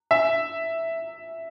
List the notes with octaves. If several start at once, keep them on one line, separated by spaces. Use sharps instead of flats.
E5